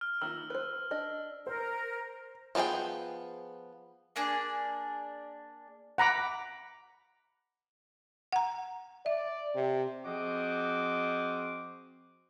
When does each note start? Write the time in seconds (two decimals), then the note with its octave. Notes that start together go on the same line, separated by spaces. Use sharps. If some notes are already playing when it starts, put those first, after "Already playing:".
0.01 F6
0.22 D#3 A#3 F4 E6
0.50 B4 C5
0.91 D4 D#5
1.47 A#4 C5
2.55 F3 B3 D4 G#4 G5
4.16 A#3 D4 G#4
5.98 F#5 A#5 B5 D6
8.32 F#5 A#5
9.06 D5 E5
9.55 C3
10.05 F3 C4 F#4 G#4 D#5 D6